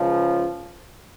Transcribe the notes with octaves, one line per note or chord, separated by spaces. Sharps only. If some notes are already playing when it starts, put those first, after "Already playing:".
Already playing: C#2 C#3 F3